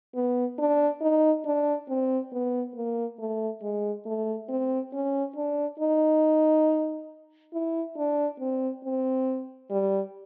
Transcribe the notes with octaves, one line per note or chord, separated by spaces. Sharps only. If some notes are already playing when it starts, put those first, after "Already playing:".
B3
D4
D#4
D4
C4
B3
A#3
A3
G#3
A3
C4
C#4
D4
D#4
E4
D4
C4
C4
G3